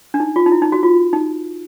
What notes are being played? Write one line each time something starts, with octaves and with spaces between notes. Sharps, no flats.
D4
D#4
F4
D#4
E4
D#4
F#4
F4
D#4